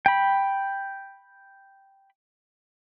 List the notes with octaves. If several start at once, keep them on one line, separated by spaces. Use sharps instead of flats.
G5 B5